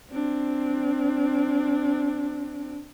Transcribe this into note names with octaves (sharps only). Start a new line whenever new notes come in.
C4 D4